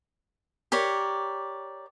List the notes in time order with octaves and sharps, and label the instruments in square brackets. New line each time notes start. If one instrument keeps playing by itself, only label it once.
[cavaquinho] G4 A#4 C#5 D5